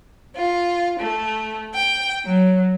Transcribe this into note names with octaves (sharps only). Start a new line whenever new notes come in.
F4
A3
G5
F#3